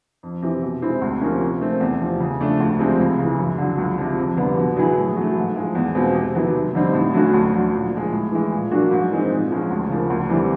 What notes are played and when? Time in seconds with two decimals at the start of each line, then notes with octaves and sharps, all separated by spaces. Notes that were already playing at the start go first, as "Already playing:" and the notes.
0.23 F2
0.42 C3 E3
0.63 B2
0.82 G#3 C4 E4
1.02 D2
1.21 C3 F3 A#3 C#4
1.42 F3
1.61 A3 C4
1.80 E2
2.00 C3 F3
2.20 C#3
2.41 F3 A3 D4
2.60 D2
2.79 C3 F3 G#3 C4
3.00 C#2
3.18 C#3
3.24 E3
3.39 F#2
3.58 D3 F#3
3.78 C#2
3.98 C3 F3
4.18 F2
4.37 D3 G3 B3
4.57 B2
4.76 F#3 B3 E4 G#4
4.97 A2
5.16 F#3 A3
5.36 G#2
5.56 F3 G#3
5.75 E2
5.95 B2 G#3 C4 F4
6.15 C3
6.35 D#3 F#3 B3 E4
6.54 D#2
6.75 D3 G3 C4 D#4
6.93 A2
7.14 F#3 A3 C#4 F#4
7.34 D2
7.52 D3 F#3
7.72 A#2
7.92 F3 G#3
8.12 A2
8.31 E3 G#3
8.52 A#2
8.71 F#3 A#3 D4 F#4
8.91 G#2
9.10 E3 G#3 C4 D#4
9.31 A#2
9.50 F3 G#3 C#4
9.71 D2
9.89 C#3 F3 A#3
10.10 D2
10.29 C3 E3 G3